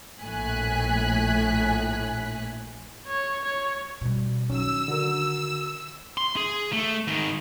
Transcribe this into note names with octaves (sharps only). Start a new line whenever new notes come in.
A#1 A2 G#5 F#6 B6
C#5
C#5
B2 G3
D#3 F#3 C#4 D#4 E6
D3 F#4 A#4
C6
G#4
A3
G#2 D#3